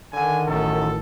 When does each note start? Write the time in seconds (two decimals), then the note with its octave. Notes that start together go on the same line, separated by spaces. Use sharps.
0.13 D3 D#3 G#5
0.47 A1 F#2 A4